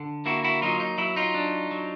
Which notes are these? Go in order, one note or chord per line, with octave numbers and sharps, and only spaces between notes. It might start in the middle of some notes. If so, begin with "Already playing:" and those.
Already playing: D3
A#3 E4 F#4
E4 F#4
F#3 D#4 F4
D#4
F#3 E4
D#4 F4
D4
F#3